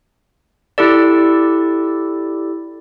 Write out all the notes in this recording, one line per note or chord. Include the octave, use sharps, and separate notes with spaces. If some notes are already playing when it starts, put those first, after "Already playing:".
E4 G4 A4 D5